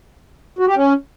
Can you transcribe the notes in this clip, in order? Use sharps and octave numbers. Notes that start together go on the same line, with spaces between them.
F#4
G4
C#4